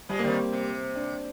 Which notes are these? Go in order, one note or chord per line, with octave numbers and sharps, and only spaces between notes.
F3 G3 G#3
A#3
D#3 G3 C4
C3
D4